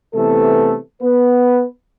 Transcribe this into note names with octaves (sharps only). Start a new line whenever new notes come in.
C3 E3 A3 B3 A4
B3 B4